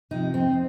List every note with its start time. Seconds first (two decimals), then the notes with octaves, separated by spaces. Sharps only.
0.11 C3 F3 D#4
0.33 F2 C4